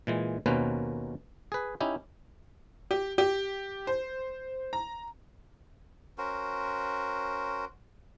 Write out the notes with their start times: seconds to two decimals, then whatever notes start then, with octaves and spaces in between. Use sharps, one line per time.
0.07 A#2 E3 G#3
0.46 D#2 B2 A#3 C#4 B4 C5
1.52 G#4 B4
1.81 C#4 D#4 E4 G4
2.91 G4
3.18 G4
3.87 C5
4.73 A#5
6.18 C#4 F#4 A#4 C5